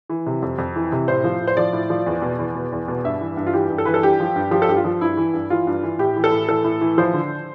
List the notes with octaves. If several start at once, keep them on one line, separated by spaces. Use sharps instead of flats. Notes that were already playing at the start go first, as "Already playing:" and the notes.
E3
C3
F2
F2
E3
C3
A2 C5
F3
A2
C5
F3 D5
A2
F3
E2
B2
E2
B2
E2
B2
G2 E5
E3
G2
F4
E3 G4
G2
A4
E3 B4
A4
G2 G4
F3
G2
F3 G4
A4
G2 G4
F4
F3
G2 E4
E3
G2
E3 F4
G2
E3
A2 G4
E3
A4
A2
E3 A4
A2
E3
F3 C5
D3